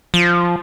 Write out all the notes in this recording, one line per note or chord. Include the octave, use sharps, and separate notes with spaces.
F3